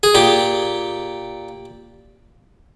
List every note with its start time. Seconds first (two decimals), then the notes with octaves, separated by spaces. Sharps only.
0.03 G#4
0.15 A#2 G4